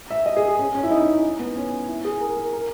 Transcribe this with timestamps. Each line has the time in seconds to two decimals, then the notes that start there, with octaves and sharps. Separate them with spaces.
0.10 E5
0.26 D#5
0.37 G#4
0.48 G#4
0.59 C#4
0.75 C#4
0.83 E4
0.91 D#4
1.02 C#4
1.23 D#4
1.39 B3
1.56 C#4
1.88 E4
2.05 G#4
2.21 A#4
2.37 A#4
2.53 A#4